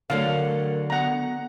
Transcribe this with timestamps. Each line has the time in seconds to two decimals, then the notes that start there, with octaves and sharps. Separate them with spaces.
0.10 D3 F#3 A3 A#4 F5
0.90 B3 F#5 A#5